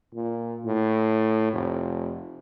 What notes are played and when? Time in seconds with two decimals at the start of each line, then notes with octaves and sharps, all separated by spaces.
0.15 A#2
0.65 A2
1.53 F1